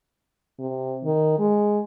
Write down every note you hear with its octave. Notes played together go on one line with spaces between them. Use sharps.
C3
D#3
G#3